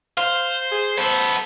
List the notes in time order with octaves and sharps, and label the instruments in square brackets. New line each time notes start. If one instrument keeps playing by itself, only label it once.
[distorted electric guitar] C5 [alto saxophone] F5
[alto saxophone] G#4
[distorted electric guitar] B3 A4 [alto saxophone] C5